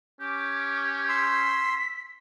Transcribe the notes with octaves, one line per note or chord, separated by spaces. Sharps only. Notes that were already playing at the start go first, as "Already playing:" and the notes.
C#4 G4 D6
C6 E6 B6